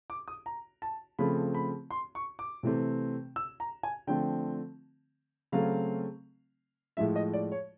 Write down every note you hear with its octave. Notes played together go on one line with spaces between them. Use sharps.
D6
D#6
A#5
A5
C#3 F3 A3 C4 B5
B5
C6
C#6
D6
C3 E3 A3 C4
E6
A#5
G#5
D3 F3 A3 C4 G5
C#3 F#3 A3 C4 F5
A2 F3 G#3 E5
D#5
D5
C#5